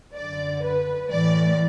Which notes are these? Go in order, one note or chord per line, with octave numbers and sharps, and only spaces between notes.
F#2 D3 D5
B4
A2 E3 D5